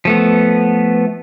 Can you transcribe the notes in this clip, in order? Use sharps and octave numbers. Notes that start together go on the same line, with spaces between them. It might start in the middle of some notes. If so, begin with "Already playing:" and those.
F3 A3 B3